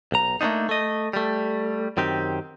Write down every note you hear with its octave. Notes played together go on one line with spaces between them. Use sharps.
B1 A#5
A3 A#3 C4 D4 D#4
A3 D#5
G3 A3
F#2 D#3 C4 G4